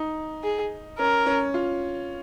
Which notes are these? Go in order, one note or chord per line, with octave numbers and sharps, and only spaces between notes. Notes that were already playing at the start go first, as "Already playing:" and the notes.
Already playing: D#4
G#4
C#4 A#4
C#4
F4